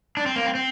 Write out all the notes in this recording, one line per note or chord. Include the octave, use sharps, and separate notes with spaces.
D4
C4
A#3
C4
C4